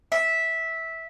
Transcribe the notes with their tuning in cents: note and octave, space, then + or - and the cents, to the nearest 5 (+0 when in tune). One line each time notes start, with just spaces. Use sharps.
E5 -10